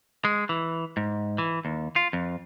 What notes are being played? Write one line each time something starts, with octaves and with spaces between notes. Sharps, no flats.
G#3
E3
G#2
E3
D#2
F4
F2